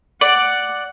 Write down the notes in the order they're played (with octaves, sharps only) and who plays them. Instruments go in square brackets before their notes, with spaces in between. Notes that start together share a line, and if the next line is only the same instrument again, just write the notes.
[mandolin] D5 [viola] F#5